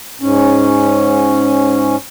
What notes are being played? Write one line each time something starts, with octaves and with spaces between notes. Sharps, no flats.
G#2 C#4